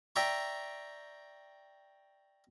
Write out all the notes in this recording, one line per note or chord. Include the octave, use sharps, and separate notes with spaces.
D5 E5 G5 A#5 C#6